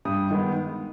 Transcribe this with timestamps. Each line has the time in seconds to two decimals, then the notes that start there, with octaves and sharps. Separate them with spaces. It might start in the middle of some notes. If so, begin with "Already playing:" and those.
0.05 G2 D#6
0.30 D#3 G#3 B3